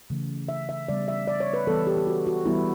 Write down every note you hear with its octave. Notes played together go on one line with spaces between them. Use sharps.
C#3 E3 A3
E5
E5
C#3 G3 B3 D5
E5
D5
C#5
B4
E3 G3 B3 A4
G4
G4
F#4
F#4
E3 G3 B3 E4